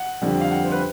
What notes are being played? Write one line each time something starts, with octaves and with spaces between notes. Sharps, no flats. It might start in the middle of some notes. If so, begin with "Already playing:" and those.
Already playing: F#5
F2 D3 G3
F5
F#5
C5
B4